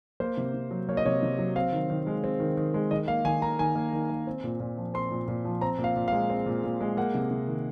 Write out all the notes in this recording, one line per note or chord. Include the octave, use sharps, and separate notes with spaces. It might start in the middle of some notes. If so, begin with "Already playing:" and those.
A#3 C5
C3
C3
F#3
A#3 C#5
D#5
C3 C#5
C3
F#3
C4 F5
D#3
D#3
G#3
C4
D#3
D#3
G#3
D#3 D#5
A#3 F5
D#3 G#5
A#3 A#5
D#3 G#5
A#3
D#3
A#3
C4
A#2
A#2
F3
C4 C6
A#2
A#2
F3
C4 A#5
A#2
F5
A#2
G#3 F5
C4
A#2
A#2
G#3
A#3 F#5
C3
C3
D#3